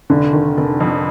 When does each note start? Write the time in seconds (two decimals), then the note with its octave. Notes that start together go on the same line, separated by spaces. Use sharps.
0.10 F1 D3
0.33 D#3
0.57 F1
0.80 F2